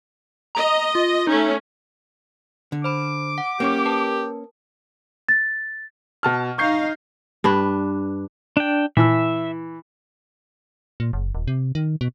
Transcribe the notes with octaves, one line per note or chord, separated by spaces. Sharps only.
D#5 A#5
F4
A3 C#4 D#4
D3
C5 B5 D6
F#5
A#3 C#4 G4 C#5
A#4 B4 A5
A6
B2 A5 F6
D#4 F5 C#6 G6 C7
G2 D4 B4
D4 G5
A#2 E3 E5 A5 E6
A#2
F#1
D#1
C3
D#3
B2